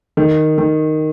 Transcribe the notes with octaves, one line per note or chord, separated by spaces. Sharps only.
D#3
D#3